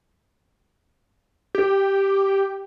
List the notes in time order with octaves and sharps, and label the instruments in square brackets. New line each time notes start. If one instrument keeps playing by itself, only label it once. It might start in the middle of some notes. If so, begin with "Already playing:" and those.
[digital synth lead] G4